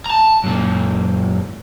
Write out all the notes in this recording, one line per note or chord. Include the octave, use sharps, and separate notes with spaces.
A5 A#5
F#2 A#2